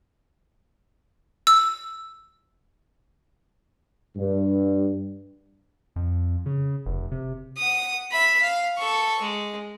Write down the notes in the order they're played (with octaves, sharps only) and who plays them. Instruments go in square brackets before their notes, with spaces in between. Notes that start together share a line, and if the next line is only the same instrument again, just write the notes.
[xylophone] E6
[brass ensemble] G2
[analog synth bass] F2
C#3
F1
C3
[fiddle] F#5 D#6
E5 B5
F5
A4 C#6
G#3